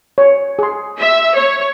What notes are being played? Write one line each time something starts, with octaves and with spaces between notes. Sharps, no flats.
C#5
G#4 C6
E5
C#5